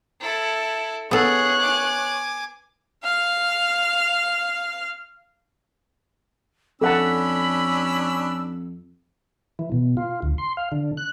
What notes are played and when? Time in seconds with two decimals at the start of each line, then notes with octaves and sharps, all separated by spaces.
0.20 E4 A4
1.11 B3 G#4 A4 C#5 F#6
1.61 G#5 D6
3.04 F5 F6
6.82 F2 C#4 D4 A4 F#5 A5 B5 E6
9.59 E3
9.72 B2
9.97 F4
10.22 D2
10.38 C6
10.57 F5
10.72 D3
10.97 F#6